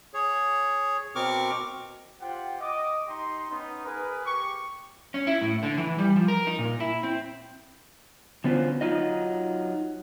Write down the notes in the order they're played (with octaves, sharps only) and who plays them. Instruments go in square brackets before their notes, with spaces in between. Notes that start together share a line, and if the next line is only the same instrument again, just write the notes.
[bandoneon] G#4 C#5
B2 C4 A#4 C#6 D6 F6
[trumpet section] F4 G4 C5 F#5 G5
D#5 D6
D#4 G4 C6
B3 C#4 D#4
G#4 A#4 B4
G4 C#6
[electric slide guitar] C#4
E4
A2
D3
E3
G3
F3
A#4
D#4
A#2
E4
C4
D3 B3 C#4 F4 F#4 C5
F#3 D#4 F4 D#5